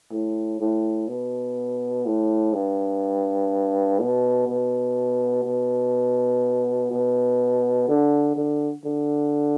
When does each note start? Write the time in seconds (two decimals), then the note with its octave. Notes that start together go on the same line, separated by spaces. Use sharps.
0.11 A2
0.60 A2
1.08 B2
2.06 A2
2.53 G2
4.00 B2
4.48 B2
5.45 B2
6.91 B2
7.88 D3
8.37 D3
8.85 D3